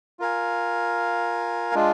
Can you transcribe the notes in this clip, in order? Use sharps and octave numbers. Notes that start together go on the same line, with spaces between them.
F4 A#4 F5 G#5
G#3 D4 F4